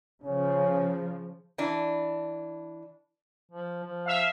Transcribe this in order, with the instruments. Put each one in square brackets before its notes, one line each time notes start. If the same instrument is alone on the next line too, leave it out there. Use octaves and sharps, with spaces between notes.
[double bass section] C#3 F3 [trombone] C#4
[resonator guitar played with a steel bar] E3 D4
[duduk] F3
F3
[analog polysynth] E5 F5